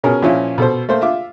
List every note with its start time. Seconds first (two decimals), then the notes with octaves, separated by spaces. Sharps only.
0.04 B2 C#4 G#4 A#4
0.22 A#2 F3 C#4 E4
0.58 B2 A4 C5
0.89 A3 A#3 C5
1.01 F4 E5 D6